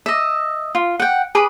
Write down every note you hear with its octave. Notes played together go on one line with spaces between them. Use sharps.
D#5 E5
F4
F#5 G5
G#4 B4 B5 D6